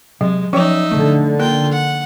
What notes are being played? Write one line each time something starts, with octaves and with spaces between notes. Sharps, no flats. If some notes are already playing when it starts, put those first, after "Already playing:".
C3 F#3 G#3
F3 C#4 D#4 C#5 D5 E5 G5 C#6
D3 A3
A#3 F4 A#4 G5
F#5